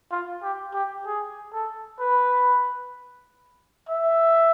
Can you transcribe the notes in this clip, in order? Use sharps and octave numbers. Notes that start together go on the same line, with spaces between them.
F4
G4
G4
G#4
A4
B4
E5